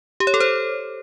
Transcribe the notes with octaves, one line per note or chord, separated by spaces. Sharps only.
G4
C#5
A4
C5